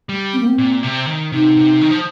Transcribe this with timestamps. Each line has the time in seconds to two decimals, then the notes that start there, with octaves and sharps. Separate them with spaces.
0.09 G3
0.33 C4
0.40 A#3
0.48 C4
0.58 A#2
0.83 C3
1.07 D#3
1.32 C3 D#4
1.57 C3
1.81 D#3
1.91 F3